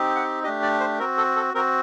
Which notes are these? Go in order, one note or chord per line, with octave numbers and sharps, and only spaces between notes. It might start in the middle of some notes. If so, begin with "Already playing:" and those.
Already playing: C4 D#4 G4
F#5
A3 D4 G4 D#5
D5
C5
C4 F#4 A#4
A4
A4
C4 F#4 A#4